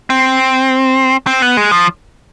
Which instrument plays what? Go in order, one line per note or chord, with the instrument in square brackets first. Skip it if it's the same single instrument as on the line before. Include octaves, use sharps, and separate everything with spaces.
[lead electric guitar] C4
C4
B3
G#3
F3